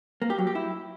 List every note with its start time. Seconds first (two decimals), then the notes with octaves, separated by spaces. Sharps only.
0.22 A#3
0.30 G4
0.38 F#3
0.47 G4
0.55 E4